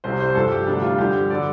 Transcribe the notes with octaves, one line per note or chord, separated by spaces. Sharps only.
C2 C3 G3 C5
C5
G2 F3 A4
G4
D2 C3 G3 D4
F4
G2 D3 F3 G4
D3 G3 D5